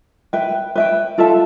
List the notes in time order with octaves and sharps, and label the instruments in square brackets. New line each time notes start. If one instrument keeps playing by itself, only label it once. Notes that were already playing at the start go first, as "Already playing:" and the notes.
[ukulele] B4 E5 G5
B4 E5 G5
F4 A4 E5 A5